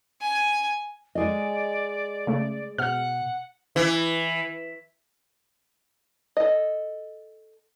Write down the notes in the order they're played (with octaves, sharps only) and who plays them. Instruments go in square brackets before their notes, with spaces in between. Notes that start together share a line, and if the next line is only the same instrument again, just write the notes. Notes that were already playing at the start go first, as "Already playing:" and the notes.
[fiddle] G#5
[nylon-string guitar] G#3 G#4 D#5 [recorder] D5
[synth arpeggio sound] C#3 A3
[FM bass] B2 [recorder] F#5 [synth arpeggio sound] F6
[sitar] E3
[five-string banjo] A4 D#5